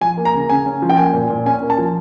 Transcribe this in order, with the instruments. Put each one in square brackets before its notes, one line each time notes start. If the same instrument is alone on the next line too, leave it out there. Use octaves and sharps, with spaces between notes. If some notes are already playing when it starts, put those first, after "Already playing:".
[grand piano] F3 G#5
A#3
A#5
C#3
C#3 G#5
C#4
F3
G5
A#3 G#5
A#2
A#2
C#4 G#5
A#3
A5
F3